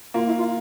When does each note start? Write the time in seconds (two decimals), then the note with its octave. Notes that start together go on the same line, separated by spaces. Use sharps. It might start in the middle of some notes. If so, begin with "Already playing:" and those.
0.14 A#3 F4
0.26 E4
0.38 F4